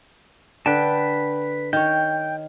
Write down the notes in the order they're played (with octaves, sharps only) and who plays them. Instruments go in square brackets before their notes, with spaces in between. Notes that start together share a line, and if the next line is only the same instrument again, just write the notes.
[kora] D3 [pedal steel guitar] B4 G5 A5
[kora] D#3 C#5 [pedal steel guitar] G5